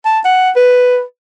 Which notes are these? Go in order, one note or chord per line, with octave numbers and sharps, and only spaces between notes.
A5
F#5
B4